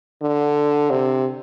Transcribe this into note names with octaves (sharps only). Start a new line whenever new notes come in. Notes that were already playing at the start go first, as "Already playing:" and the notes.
D3
C3